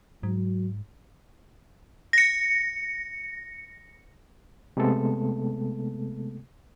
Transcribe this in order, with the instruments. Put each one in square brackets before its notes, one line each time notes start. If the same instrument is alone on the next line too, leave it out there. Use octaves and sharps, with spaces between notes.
[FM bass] G#2 [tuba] F#3
[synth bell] A#6 C#7
[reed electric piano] C3 G#3 A3 B3 A4